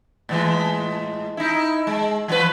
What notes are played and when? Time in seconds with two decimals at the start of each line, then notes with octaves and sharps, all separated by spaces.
0.29 A2 E3 G#3
1.37 D#4 E4
1.87 G#3
2.28 E3 F3 B4